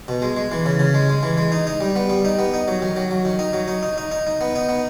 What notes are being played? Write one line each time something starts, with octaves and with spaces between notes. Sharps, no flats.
B2
G#3
G#3
E3
C#3
C#3
G#3
G#3
E3
G#3
D#4
D#4
G3
B3
G3
D#4
B3
D#4
F#3
D#3
F#3
F#3
D#3
D#4
F#3
D#4
D#4
D#4
D#4
D#4
B3
D#4
B3